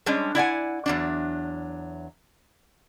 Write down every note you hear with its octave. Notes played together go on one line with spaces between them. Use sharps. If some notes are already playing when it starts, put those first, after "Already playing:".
G3 G#3 C#4 D4
E4 D5 F#5 G#5
E2 F#3 D4